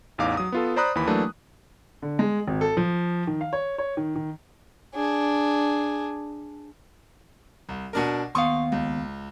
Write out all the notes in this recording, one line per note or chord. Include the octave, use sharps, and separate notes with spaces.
A1 E2 D#4 F5 D6
F#3 D#6
B3 F4 A4
C5 D5 A#5 B5 D#6 F#6
D#2 E3 B5
E3 F#3 A3 A#3 D4
D3
G#3
G#1
A4
F3
D#3
F5
C#5
C#5
D#3
D#3
D4 G#4
C2
B2 D4 A#4
D#2 B3 F5 C6 C#6 D#6
C#2